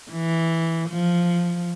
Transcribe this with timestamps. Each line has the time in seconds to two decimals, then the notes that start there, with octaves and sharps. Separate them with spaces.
0.11 E3
0.89 F3